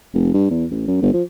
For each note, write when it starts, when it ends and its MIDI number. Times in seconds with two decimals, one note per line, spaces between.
0.14 0.33 29
0.34 0.48 43
0.50 0.65 40
0.71 0.83 33
0.88 1.00 42
1.02 1.12 31
1.14 1.23 53